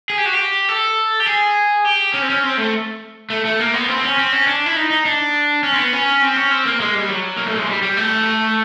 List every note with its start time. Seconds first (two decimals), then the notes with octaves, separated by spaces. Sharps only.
0.10 G#4
0.18 G4
0.26 F#4
0.33 G4
0.69 A4
1.20 G4
1.26 G#4
1.85 G4
2.14 C#4
2.22 C4
2.30 C#4
2.43 C4
2.58 A3
3.30 A3
3.45 A3
3.60 A#3
3.74 B3
3.89 C4
4.03 C#4
4.18 C4
4.33 C#4
4.47 D4
4.66 E4
4.76 D#4
4.90 D#4
5.05 D4
5.63 C#4
5.73 C4
5.78 B3
5.93 C#4
6.22 C4
6.36 C#4
6.51 C4
6.65 A#3
6.80 G#3
6.95 G3
7.09 F#3
7.37 A#3
7.46 A3
7.57 G#3
7.68 G3
7.82 G3
7.97 A3